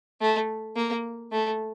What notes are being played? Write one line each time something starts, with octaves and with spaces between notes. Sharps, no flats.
A3
A#3
A3